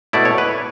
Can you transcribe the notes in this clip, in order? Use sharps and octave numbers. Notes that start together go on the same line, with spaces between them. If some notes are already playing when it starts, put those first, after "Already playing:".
B2 A3 E4 D5
C#5
B4